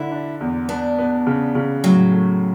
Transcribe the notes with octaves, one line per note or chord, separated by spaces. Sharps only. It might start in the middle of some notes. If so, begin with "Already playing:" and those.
Already playing: D3 D4 E4
D4
E2
B3 D4
B3
C#3
C#3
A2 F#3
A3